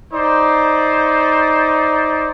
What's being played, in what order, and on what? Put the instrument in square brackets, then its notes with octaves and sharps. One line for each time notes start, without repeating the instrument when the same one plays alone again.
[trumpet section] D#4 C5 D5